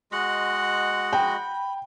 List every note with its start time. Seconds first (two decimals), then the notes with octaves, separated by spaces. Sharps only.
0.12 G#3 F#4 D#5 F#5 C6
1.13 G5 B5